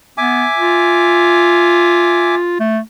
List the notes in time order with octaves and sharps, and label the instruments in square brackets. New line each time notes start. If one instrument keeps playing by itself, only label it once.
[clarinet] B3 [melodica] E5 G#5 D6
[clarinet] F4
A3